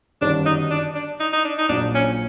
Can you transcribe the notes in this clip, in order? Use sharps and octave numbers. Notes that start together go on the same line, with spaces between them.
G1 F#2 D#3 G3 B3 D4
D#4
D4
D4
D#4
D#4
D4
D#4
A#1 A#2 F#3 D4
C#4